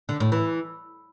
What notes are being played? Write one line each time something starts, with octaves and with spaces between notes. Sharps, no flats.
D3
A2
E3